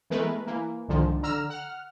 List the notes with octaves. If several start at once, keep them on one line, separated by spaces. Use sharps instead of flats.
E3 G#3 A3 B3 A#4 B4
E3 A#3
C2 F2 G#2 D3 D#3 F3
D3 A#5 E6 F6
F#5 F6